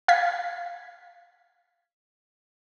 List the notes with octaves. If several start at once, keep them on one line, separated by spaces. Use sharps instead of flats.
F5 G#6 B6